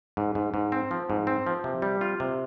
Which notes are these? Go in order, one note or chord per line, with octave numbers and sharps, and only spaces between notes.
G#2
G#2
G#2
C4
F3
G#2
C4
F3
C3
G3
F4
C3